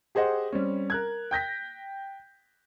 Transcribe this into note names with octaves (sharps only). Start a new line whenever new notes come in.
G4 G#4 C5 D#5 F#5
G3 C4 C#4
A#4 F#6 G#6
G5 G6 A#6 B6